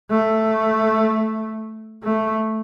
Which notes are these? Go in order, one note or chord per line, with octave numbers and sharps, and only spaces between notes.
A3
A3